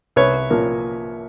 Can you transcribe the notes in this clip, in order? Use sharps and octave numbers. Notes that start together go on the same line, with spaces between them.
C2 B4 C#5
A#2 F3 A#3